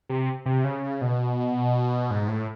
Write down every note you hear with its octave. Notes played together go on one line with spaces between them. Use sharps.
C3
C3
C#3
B2
G#2
A2